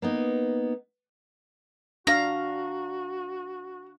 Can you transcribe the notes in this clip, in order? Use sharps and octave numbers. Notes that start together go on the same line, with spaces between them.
A#3 B3 D#4
D4 F#4 F5 A#5